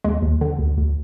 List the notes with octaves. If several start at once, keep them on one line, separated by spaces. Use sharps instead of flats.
D#2 G#3
D#2
D3
D2
D2